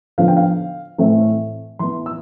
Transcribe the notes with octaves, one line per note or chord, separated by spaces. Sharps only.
D3 F3 B3 F5
G5
F5
A2 E3 A3 C4
E3 B3 C6
E6